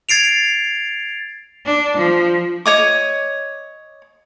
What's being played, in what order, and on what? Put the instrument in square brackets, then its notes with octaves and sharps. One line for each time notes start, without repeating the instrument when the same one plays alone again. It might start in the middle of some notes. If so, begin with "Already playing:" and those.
[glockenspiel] G#6 A6 C7 D7 F7
[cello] D4
F3
[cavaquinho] C#5 D#5 D6